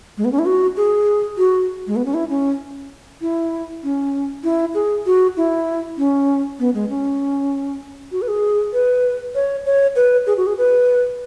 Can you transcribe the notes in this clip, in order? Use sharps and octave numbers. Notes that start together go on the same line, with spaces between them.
G#3
B3
C#4
E4
F#4
G#4
F#4
G#3
B3
C#4
E4
C#4
E4
C#4
E4
G#4
F#4
E4
C#4
B3
G#3
C#4
F#4
B4
G#4
B4
C#5
C#5
B4
G#4
F#4
G#4
B4